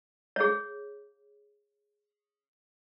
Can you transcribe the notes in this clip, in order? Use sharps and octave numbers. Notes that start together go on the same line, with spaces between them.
G#4 C#5